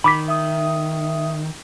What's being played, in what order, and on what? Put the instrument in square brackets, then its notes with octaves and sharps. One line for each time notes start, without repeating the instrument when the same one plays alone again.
[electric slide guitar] D#3 [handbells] B5 D6 B6
[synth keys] E5 D#6